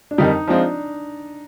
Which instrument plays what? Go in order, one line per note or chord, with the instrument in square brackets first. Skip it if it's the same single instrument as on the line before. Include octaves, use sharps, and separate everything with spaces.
[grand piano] D4
[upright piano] F2 D#3 G3 [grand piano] D#4
[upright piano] F3 G#3 C4 F4 [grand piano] D4